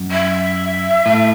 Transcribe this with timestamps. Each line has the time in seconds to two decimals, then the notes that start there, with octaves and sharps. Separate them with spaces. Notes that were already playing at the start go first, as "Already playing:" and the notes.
Already playing: F#2
0.11 E5
1.06 A2